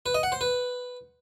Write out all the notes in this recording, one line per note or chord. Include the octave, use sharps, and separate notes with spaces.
B4
D#5
F#5
C5
B4